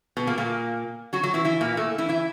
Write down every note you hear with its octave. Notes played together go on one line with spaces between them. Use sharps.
B2 B3
A#2 A#3
A#2 A#3
F#3 F#4
F#3 F#4
E3 E4
E3 E4
A#2 A#3
A3
E3 E4
E3 E4